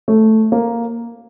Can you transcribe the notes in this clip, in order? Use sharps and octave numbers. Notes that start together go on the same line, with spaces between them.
A3
A#3